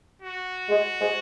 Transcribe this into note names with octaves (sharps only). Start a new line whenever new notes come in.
F#4
G#3
G#3